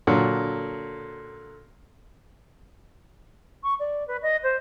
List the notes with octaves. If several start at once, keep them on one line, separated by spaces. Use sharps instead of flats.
A#2 D3 F#3
C#6
D5
B4
D#5
C5